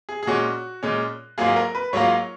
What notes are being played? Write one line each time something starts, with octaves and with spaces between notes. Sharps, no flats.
G#4
G#4
A#2 G#3 C#4 F#4
A#2 G#3 C#4
G#2 F#3 A#3 F4 G#4
A#4
B4
G#2 F#3 A#3 F4 C#5